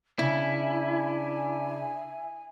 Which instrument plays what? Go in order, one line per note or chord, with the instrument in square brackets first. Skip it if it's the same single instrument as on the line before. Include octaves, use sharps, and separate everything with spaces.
[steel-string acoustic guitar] C#3 [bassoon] D4 [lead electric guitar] E4 [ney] G#5